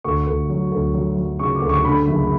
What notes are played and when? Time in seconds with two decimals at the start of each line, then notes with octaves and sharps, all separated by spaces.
0.04 D2 C#6
0.27 D2
0.49 F#3
0.72 D2
0.94 F#3
1.17 F#3
1.39 C#3 C#6
1.55 D6
1.62 D2
1.69 C#6
1.84 D3 B5
2.07 F#1